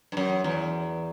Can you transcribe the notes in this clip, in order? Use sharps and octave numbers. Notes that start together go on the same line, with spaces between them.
G2
F#2
E2